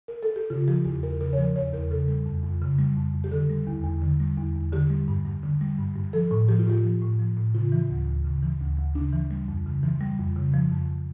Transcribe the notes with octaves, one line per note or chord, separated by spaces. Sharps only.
A#4
A4
G4
C#3 F4
F3 G4
E2 G4
E2 A#4
C#3 A#4
C#5
F3 A#4
E2 C#5
E2 A#4
C#3 A4
G3
F2
F2
C#3
G3
F2
F2
G4
D3 A4
G3
E2
E2
D3
G3
E2
E2
D3 G4
G3
G2
G2
D3
G3
G2
G2
F3 A4
A2
F3 G4
F4
A2 G4
F3
A2
F3
A2
C#3 F4
E3
D2
D2
C#3
E3
D2
D2
C#3 D4
E3
G3
F2
C#3
E3
G3
F2
C#3
F3
F2